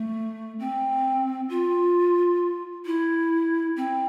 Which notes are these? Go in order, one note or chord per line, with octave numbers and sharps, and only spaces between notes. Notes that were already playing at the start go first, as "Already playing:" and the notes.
Already playing: A3
C4
F4
E4
C4